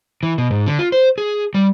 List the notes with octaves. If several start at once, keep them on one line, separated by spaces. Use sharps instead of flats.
E3
B2
G#2
D3
F4
C5
G#4
G3